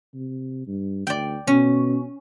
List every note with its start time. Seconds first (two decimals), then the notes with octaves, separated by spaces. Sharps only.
0.14 C3
0.67 G2
1.07 D2 D5 G5
1.47 B2 C#4